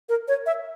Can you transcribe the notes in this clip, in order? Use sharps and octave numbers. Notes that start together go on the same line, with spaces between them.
A#4
C#5
E5